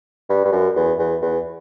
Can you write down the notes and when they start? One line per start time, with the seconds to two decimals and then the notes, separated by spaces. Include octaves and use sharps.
0.29 G2
0.45 G2
0.52 F#2
0.76 E2
0.99 E2
1.22 E2